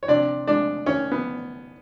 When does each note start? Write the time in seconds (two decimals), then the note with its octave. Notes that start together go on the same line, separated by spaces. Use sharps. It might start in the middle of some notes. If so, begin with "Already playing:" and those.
0.03 C#5
0.08 C3 D4 D5
0.47 G#3 D4 D5
0.86 D#3 C#4 C#5
1.12 B3